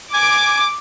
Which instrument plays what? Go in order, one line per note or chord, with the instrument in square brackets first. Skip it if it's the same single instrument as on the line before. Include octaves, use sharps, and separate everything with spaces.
[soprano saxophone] G#5 [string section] D6